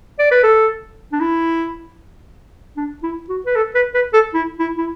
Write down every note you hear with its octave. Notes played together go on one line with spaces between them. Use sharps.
D5
B4
A4
D4
E4
D4
E4
F#4
B4
A4
B4
B4
A4
E4
E4
E4